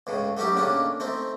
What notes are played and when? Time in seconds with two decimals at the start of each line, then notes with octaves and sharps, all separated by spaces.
0.07 C#2 A2 C#3
0.37 F#3 A3 C#4 D#4 G4
0.55 A2 C#3 A#3 C#4 D4
1.00 A3 C4 D#4